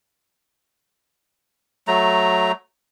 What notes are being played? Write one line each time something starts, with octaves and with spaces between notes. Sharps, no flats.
F#3 A3 A#5